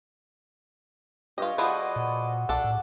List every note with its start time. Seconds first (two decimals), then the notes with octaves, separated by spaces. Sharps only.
1.38 G2 F4 G4 C#5 D#5
1.58 F3 B3 E4 F#4 G#4 A4 D5 D#5
1.96 A#2
2.49 B1 D4 A4 F#5
2.64 A2